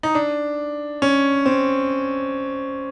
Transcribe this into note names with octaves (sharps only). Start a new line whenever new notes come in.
D#4
D4
C#4
C4